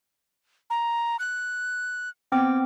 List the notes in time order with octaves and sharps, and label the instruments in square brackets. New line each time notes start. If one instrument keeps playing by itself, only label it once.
[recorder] A#5
F#6
[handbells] B3 C4 D6 [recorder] G5